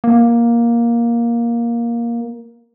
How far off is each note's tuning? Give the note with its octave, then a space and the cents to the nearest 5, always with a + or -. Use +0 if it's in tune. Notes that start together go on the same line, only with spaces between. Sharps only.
A#3 +10